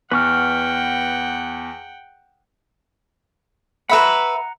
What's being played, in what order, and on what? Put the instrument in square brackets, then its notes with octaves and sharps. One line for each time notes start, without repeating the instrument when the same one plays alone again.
[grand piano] E2 [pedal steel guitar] B4 C#6 F6 [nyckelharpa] F#5 G5
[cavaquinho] B4 E5 B5 [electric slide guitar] F#5 A#5